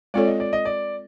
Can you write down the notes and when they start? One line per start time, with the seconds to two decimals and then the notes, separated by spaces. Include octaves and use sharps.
0.14 G#3 C4 F4 A4 C#5 D5
0.27 D#5
0.40 D5
0.53 D#5
0.65 D5